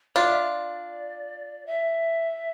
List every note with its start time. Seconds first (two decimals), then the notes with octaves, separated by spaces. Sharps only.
0.16 D4 F4 D5
0.27 E5
0.39 D5
1.66 E5